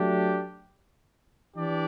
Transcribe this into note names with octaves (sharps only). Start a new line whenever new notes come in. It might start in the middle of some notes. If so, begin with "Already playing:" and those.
Already playing: F#3 A3 D4 G4
E3 D4 G4 D5